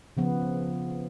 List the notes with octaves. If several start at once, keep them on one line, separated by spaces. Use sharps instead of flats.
C#3 F3 B3